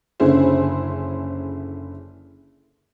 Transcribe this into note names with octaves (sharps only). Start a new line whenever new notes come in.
F#1 D3 C#4 E4 G#4 C5